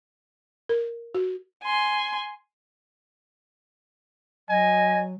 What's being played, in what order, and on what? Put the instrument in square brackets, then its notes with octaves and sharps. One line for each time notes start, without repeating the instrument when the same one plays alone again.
[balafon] A#4
F#4
[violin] G#5 C6
[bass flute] F#3 [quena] D#5 [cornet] G#5